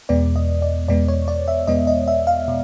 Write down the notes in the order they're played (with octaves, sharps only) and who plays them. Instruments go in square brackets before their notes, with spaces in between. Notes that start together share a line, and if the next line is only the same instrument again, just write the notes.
[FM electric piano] E2 B2 G#3 B3 D5
D#5
D5
E2 B2 G#3 B3 D5
C#5
D5
E5
E2 B2 G#3 B3 D#5
D#5
E5
F5
B2